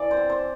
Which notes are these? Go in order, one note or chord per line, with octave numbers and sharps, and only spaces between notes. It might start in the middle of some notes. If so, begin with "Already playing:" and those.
Already playing: E3 D5
C5
C4
C5